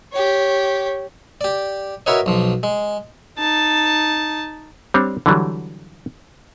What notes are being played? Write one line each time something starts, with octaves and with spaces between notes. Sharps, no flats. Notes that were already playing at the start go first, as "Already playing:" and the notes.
G4 C#5
G4 D5
E4 F#4 A#4 B4 C#5 D#5
B1 F3
G#3
D#4 A5
G3 C4 D4 C#5
D3 E3 F#3 G3